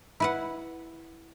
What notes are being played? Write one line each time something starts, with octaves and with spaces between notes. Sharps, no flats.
E4 B4 F#5